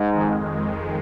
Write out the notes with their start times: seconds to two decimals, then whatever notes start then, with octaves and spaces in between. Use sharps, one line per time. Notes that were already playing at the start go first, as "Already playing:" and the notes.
Already playing: G#2
0.12 F2 D#3 G#3